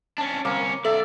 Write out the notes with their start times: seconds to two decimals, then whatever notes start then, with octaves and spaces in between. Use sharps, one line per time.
0.18 C#4 D4
0.45 C2 A#3 C#4
0.85 B1 A4 D5 E5